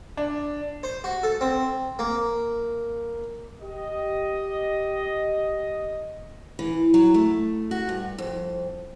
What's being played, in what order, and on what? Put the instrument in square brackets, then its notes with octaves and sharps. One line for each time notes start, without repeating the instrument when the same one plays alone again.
[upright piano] D4
[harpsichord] C5
F#4
A4
C4
A#3
[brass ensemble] G4 D#5
[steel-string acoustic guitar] E3
F#3
A3
F#4
G2
F2